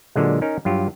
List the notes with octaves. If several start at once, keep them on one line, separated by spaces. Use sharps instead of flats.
A#2 D3 F#3 G#3
C#4 D#4 A#4
G2 F#3 F4 G4